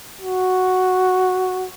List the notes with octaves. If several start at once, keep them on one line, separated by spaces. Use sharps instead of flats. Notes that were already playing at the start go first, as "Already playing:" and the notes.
F#4